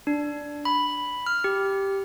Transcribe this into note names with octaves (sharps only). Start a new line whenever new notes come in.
D4
B5
F6
G4